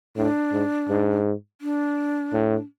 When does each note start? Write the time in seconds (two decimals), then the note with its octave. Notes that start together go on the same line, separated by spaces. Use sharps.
0.17 A2 D4
0.52 G#2
0.89 G#2
1.61 D4
2.34 A2